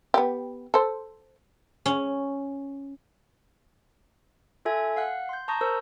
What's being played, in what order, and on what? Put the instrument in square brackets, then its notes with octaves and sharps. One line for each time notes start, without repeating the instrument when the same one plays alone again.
[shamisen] B3 G4
A4 C5
[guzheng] C#4
[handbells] F4 A4 E5 G#5 G#6
F5 F#5 F#6
C6 G6
A5 A#5 C#6 D#6 G6 A#6
A#4 C5 E6